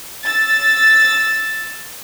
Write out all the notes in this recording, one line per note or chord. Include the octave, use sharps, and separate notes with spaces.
E6 A6